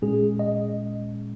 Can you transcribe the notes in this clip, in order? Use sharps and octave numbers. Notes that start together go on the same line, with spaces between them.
A#2 G#3 C#4 G#4
D#5